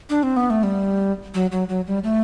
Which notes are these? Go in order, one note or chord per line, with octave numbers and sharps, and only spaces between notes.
D4
C4
B3
A3
G3
F#3
F#3
F#3
G3
A3